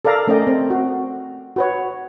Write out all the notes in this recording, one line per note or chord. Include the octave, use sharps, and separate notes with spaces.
A4 A#4 D5 F5 A#5
A3 C#4 A#4 D5 D#5 G5
C4
F#4
F#4 B4 C#5